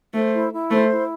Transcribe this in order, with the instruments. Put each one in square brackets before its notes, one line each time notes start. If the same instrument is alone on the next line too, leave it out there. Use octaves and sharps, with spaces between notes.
[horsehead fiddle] A3 [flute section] C5
[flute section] E4
E4
[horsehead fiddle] A3 [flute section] C5
[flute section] E4